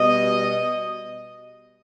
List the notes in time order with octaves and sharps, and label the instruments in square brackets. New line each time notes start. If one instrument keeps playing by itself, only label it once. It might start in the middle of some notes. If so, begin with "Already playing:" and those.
Already playing: [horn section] B2 G3 D#5